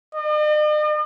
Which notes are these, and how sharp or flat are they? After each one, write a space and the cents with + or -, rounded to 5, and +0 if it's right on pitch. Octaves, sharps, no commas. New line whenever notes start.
D#5 -45